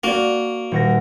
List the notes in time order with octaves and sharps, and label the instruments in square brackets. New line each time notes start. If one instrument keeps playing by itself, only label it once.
[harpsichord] A#3 [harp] F#4 D5
[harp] D#1 F#5 A#6